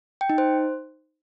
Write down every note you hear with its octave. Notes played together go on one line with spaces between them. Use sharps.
G5
D#4
C5